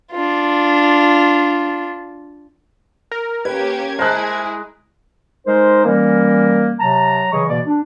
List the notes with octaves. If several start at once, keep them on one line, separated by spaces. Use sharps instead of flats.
D4 F4
A#4
A#3 C#4 G4 B4 G#6
G#3 E4 G#4 A#4 C5 A5 F#6
G#3 D#4 A#4 C5
E3 G3 A#3 C#4 A#4
C3 F#3 A5 A#5
C#3 E3 F#3 G#4 D#5 C#6
B2 E3 A#3 D5
D4